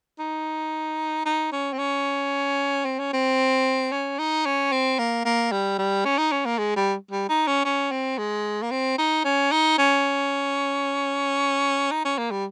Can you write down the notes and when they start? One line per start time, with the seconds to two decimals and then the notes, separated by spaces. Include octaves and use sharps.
0.19 D#4
1.26 D#4
1.52 C#4
1.73 C4
1.79 C#4
2.85 C4
2.99 C#4
3.13 C4
3.92 C#4
4.19 D#4
4.46 C#4
4.72 C4
4.99 A#3
5.25 A#3
5.52 G3
5.79 G3
6.05 C#4
6.18 D#4
6.32 C#4
6.46 A#3
6.58 G#3
6.76 G3
7.11 G3
7.29 D#4
7.47 C#4
7.65 C#4
7.92 C4
8.18 G#3
8.62 A#3
8.71 C4
8.98 D#4
9.25 C#4
9.52 D#4
9.78 C#4
11.91 D#4
12.05 C#4
12.18 A#3
12.31 G3